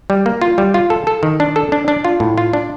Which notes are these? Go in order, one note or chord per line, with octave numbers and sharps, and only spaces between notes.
G3
A#3
F4
G3
F4
A4
A4
D#3
D4
A4
D4
D4
F4
A2
F4
D4